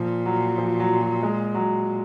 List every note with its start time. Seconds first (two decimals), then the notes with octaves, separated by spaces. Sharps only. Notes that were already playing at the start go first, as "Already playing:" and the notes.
Already playing: A#2 F3
0.26 F#3
0.58 F3
0.80 F#3
1.01 F#3
1.23 G#3
1.55 F#3